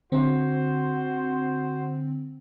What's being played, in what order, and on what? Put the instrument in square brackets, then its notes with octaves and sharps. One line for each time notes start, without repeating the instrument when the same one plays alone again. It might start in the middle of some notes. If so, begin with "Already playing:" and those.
[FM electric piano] D3 C4 [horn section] F#4 C5